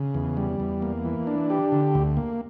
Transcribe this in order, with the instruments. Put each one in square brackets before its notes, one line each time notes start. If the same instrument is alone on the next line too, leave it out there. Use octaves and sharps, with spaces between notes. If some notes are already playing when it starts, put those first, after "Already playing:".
Already playing: [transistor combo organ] C#3
E2
G3
E2
A#3
E3
D4
G4
D3
D2
A#3